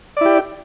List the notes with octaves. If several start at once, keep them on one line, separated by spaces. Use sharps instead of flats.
E4 G4 D5